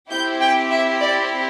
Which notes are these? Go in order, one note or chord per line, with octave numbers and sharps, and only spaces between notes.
C4 E4 G4 G6
G5
E5
D5